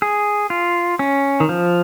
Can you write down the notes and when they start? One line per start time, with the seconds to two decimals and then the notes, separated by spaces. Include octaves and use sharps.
0.02 G#4
0.50 F4
0.99 C#4
1.40 D#3
1.49 F3